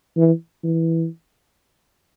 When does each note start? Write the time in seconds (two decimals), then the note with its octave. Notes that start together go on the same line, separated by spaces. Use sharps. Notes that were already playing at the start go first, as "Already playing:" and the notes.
0.17 E3
0.64 E3